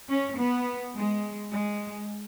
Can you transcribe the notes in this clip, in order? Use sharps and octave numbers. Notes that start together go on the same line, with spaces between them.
C#4
B3
G#3
G#3